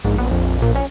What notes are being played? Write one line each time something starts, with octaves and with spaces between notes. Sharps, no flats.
A#1 G#2
B3
F2
A#2
C#4